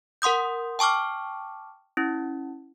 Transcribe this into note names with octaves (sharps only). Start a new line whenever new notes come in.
A#4 F#5 C6 D#6 G6
G5 A5 C#6 D6 F6
C#4 E4